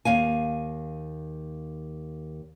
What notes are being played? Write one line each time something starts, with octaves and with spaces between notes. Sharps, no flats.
D#2 F5 G#5